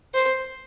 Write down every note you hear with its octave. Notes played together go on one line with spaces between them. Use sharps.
C5